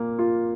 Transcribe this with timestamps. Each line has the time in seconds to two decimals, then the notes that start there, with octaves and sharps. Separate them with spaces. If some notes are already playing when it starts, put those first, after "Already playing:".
Already playing: A#2 A#3
0.19 F4